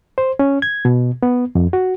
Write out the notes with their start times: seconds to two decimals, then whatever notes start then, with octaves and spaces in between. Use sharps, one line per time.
0.18 C5
0.39 C#4
0.62 G#6
0.85 B2
1.23 B3
1.55 F2
1.73 F#4